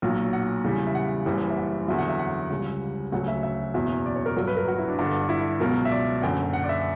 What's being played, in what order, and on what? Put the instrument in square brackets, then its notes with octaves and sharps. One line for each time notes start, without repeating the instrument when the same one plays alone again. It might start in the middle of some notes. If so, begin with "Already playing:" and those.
[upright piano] B1 A#2 F#3
F#5
E2 C#3 E3 G3
E5
F#5
F#1 F#2 E3 G3 G5
E5
F#5
E2 D3 F#3 E5
F#5
E5
F#5
C#2 C#3 G3
D2 C#3 F#3 F#5
E5
E5
F#1 E2 B2 F#3 E5
D5
C#5
A#4
G1 G2 F#3 A#4
B4
A#4
F#4
E4
D4
G1 G2 D3 D4
E4
C#2 B2 F#3 A#4
E5
D5
F#1 F#2 D3 G5
F#5
D5
E5